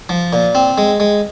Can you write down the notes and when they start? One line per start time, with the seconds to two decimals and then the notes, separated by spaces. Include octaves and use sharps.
0.09 F3
0.33 A#2
0.55 C4
0.78 G#3
1.00 G#3